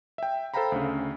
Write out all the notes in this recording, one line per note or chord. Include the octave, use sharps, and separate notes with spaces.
E5 G5
A4 C5 F5 G5 A#5 B5
D2 C#3